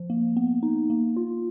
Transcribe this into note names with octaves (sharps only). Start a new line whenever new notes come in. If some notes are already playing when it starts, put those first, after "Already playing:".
Already playing: F3
A#3
B3
D#4
A#3
F4